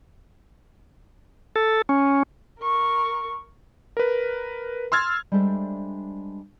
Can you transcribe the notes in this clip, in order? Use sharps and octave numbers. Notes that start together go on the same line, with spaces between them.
A4
C#4
A#4 C#6
A#4 B4
C6 E6 F6 G#6 A6
G3 G#3 D4 A4 C5 E5